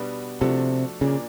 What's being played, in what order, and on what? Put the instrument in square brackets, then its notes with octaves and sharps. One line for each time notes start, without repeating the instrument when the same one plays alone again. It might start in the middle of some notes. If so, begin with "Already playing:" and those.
Already playing: [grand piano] B2 G3 B3 D4
[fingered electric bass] C3 [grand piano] F3 A3 D4 F#4 A4
[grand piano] A#2 F3 A#3 D4 [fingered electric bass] C#3